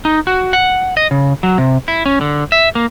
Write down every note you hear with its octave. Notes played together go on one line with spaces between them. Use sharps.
D#4
F#4
F#5
D#5
C#3
F#3
C3
E4
C#4
D3
E5
A#3